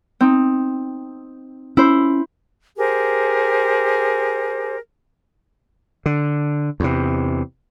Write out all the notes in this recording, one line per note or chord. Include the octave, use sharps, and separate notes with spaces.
C4 D#4
C#4 E4 C5
G4 G#4 A#4 C5
D3
E2 C3